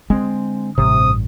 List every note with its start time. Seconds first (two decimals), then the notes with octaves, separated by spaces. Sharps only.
0.10 D3 G#3 C4
0.78 A1 G2 C3 D#6